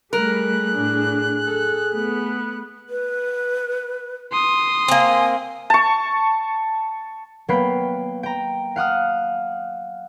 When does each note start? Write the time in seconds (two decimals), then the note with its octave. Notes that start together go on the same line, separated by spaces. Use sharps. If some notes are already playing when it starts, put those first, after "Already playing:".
0.13 G3 A3 G#4 A#4 F#6
0.75 A2 D4
1.46 A4
1.91 A3 B3
2.89 B4
4.32 C6 D#6
4.88 A#3 C4 G#5
5.70 A5 C#6
7.48 F#3 A#3 B3 B4 G5 C7
8.23 G5 A#5
8.76 F5 F#5 D#6 F6